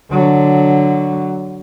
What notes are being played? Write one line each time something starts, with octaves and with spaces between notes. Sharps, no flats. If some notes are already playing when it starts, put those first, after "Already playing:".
D3 F#3